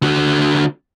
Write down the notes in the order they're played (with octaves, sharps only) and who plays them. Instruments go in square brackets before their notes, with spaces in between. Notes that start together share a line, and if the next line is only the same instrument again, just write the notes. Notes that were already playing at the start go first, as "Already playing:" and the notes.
[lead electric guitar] D3 F#4